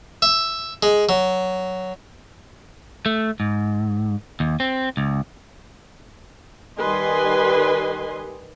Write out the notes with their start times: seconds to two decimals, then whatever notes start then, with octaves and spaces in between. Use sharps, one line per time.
0.22 E5
0.83 G#3
1.09 F#3
3.06 A3
3.40 G#2
4.40 D#2
4.60 C4
4.97 C#2
6.79 D#3 G3 B4 D#5 G#5 C6